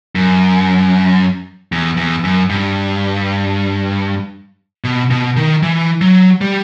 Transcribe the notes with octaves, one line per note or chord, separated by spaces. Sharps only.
F#2
E2
E2
F#2
G2
B2
B2
D#3
E3
F#3
G3